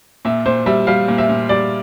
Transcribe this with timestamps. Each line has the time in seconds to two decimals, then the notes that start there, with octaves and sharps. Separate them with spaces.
0.25 A#2 E5
0.46 A#2 C5
0.66 G3 E5
0.87 G3 F5
1.08 A#2
1.18 E5
1.29 A#2
1.49 G3 D5